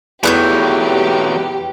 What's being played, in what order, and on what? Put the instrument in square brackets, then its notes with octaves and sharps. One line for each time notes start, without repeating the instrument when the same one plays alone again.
[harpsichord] E2 [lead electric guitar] E3 F#3 [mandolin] A3 F#6 G6 [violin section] G4